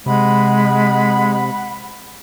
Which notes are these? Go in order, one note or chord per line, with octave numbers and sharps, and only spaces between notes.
C3 G#3 F#5 B5